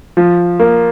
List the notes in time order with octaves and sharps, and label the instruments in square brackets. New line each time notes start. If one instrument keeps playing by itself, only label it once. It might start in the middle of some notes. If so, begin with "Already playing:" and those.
[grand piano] F3
A#3